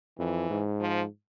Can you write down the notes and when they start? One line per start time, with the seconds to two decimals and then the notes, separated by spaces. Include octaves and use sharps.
0.19 F2 E3
0.50 G#2
0.80 F3